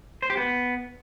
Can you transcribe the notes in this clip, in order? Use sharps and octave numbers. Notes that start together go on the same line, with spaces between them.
C5
G4
B3